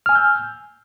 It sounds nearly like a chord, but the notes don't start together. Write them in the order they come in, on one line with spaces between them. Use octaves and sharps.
F6 G#5 E6 G6